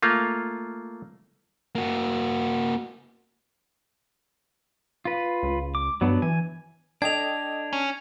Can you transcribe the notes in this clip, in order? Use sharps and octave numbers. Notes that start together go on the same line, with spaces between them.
A3 A#3 F4
A#3 F#4
F4 B4
C#2
D6
G2 F#3 B3 D4
E3 G#5
D4 A4 D#5 G5 G#6 F7
C#4